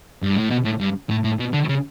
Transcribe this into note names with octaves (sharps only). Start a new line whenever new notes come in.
G2
A2
B2
A2
G2
A2
A2
B2
D3
C#3